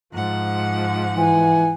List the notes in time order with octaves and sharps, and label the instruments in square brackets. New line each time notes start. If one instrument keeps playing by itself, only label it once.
[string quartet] G#2 F3 F#5
[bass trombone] E3 [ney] G#5